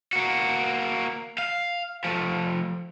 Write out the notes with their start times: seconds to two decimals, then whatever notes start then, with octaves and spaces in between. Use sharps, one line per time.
0.13 A#3 F#4
1.38 F5
2.05 F3 A3